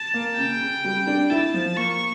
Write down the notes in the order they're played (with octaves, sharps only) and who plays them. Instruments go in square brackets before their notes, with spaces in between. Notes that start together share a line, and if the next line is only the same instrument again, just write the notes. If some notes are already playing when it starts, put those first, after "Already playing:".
Already playing: [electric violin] A5
[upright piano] A#3
[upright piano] C#3 [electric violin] G5
[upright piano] C#3
G3
D4
[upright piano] E4 [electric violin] A5
[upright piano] F3
[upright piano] A#3 [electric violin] C#6